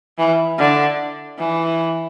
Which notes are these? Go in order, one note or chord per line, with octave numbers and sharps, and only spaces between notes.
E3
D3
E3